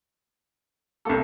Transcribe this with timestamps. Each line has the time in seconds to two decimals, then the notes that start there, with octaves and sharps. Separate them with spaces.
1.05 C2 A3 A#3 A4